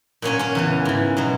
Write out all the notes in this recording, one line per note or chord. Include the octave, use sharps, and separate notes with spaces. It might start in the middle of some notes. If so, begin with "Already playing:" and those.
A#2 F#3 C#4 C#5
C#4 C#5
E2 C#3 E3
G#2 E3
B2 F#3